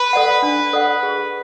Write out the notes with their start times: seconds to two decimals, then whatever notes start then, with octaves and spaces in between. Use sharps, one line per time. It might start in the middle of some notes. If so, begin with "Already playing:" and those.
Already playing: B4
0.13 A4 D5 F#5
0.42 D4
0.73 A4 D5 F#5
1.03 G#4